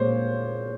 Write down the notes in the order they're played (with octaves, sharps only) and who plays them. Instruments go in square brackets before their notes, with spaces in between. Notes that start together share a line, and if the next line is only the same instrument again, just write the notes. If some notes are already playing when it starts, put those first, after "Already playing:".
Already playing: [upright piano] A#2 G#3 C5 C#5